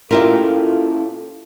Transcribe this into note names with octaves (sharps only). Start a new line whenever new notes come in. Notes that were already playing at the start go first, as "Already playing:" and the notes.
A#2 C#4 E4 F4 G4 A4 A#4 E5